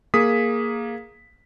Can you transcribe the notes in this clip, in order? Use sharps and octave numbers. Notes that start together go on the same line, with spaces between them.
A#3 G#4 D#6 B6